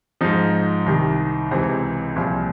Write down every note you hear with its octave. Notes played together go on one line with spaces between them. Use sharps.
G#2 F3 D#4
C2 C3 D#3
C#2 C3 E3 C4
C2 A#2 F3